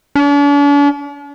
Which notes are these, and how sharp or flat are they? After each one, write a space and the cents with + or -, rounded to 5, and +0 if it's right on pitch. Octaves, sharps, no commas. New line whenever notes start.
D4 -45